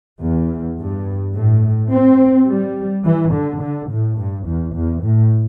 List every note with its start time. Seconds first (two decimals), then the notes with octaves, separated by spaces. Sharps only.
0.22 E2
0.78 G2
1.35 A2
1.91 C4
2.48 G3
3.04 E3
3.32 D3
3.61 D3
3.89 A2
4.18 G2
4.46 E2
4.74 E2
5.02 A2